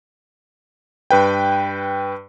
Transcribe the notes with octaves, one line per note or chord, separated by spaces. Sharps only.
G2 B4 G5